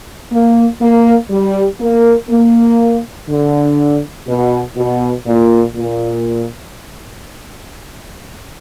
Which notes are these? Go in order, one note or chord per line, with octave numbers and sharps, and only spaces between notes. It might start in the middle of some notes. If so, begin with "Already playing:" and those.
A#3
A#3
G3
A#3
A#3
D3
B2
B2
A#2
A#2